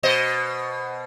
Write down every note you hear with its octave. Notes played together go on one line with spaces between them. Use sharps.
B2 C5 D#5